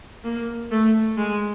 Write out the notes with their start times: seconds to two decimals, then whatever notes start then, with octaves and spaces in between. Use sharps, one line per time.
0.24 A#3
0.71 A3
1.17 G#3